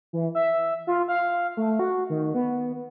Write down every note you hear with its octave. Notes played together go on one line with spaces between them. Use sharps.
E3
E5
F4
F5
A3
F#4
D#3
B3